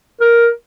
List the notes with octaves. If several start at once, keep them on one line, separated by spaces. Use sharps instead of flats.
A#4